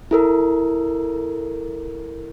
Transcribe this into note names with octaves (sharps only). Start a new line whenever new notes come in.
E4 A4 A#4